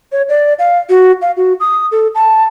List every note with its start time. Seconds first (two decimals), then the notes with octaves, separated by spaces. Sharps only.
0.12 C#5
0.29 D5
0.59 F5
0.89 F#4
1.22 F5
1.37 F#4
1.60 D#6
1.92 A4
2.15 A5